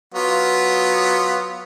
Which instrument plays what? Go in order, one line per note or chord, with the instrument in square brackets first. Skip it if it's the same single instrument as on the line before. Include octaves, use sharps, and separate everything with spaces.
[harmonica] F#3 B3 F4